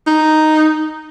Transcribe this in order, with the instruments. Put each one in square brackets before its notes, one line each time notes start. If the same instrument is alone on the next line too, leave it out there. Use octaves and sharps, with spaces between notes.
[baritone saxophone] D#4